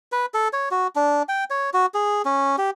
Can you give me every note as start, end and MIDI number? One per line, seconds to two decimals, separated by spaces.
0.12 0.26 71
0.34 0.48 69
0.53 0.69 73
0.71 0.87 66
0.96 1.22 62
1.29 1.44 79
1.50 1.70 73
1.74 1.86 66
1.94 2.22 68
2.25 2.56 61
2.58 2.70 67